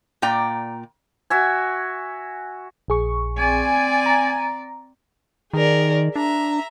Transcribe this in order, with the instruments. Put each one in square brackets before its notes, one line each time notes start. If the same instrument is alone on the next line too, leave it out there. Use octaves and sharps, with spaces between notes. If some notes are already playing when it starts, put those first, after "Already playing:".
[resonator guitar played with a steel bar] A#2 D5 G5 A#5
[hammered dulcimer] F#4 E5 G#5
[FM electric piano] A#1 G#4 C#6
[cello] C4 D5 [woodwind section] G#5
[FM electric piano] A#5
[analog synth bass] D#3 [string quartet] G#4 A#4 D5
[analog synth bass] D4 [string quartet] E5 A#5